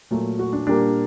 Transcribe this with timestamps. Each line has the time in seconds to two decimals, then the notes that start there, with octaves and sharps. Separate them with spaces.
0.11 A#2 F#3 A3
0.39 F#4
0.53 D4
0.67 A#2 G3 A#3 D4